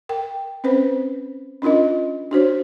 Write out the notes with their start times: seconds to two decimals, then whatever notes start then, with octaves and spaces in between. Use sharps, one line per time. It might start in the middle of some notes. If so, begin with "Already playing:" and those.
0.09 A#4 G5
0.64 C4 C#4 B4 C5
1.62 C#4 D4 F4 A#4 D#5
2.31 D4 F#4 C5 C#5